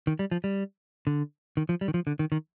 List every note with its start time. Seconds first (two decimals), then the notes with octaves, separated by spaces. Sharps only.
0.07 D#3
0.19 G3
0.31 F3
0.44 G3
1.07 D3
1.57 D#3
1.69 F3
1.81 G3
1.88 D#3
1.94 F3
2.07 D3
2.19 D#3
2.32 D#3